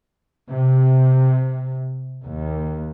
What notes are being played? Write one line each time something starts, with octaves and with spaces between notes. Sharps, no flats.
C3
D#2